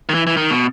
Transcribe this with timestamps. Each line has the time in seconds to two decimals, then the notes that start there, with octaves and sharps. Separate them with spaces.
0.09 D#3
0.14 E3
0.27 E3
0.37 D#3
0.51 B2